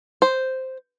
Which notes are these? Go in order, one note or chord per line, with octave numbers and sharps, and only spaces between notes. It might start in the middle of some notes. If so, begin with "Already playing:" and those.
C5